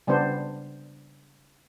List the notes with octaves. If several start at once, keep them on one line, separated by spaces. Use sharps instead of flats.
C#3 G3 B3 D4 C5